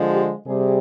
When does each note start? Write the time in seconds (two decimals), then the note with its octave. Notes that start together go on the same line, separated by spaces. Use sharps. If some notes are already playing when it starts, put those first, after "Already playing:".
Already playing: D3 F3 G#3
0.10 G4
0.45 C3 G3 G#4